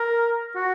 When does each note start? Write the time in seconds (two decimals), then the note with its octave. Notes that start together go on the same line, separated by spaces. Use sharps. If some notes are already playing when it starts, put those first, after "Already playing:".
Already playing: A#4
0.56 F#4